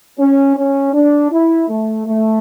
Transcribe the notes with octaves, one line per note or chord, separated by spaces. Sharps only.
C#4
C#4
D4
E4
A3
A3